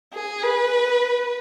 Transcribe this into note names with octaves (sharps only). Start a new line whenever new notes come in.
G#4
B4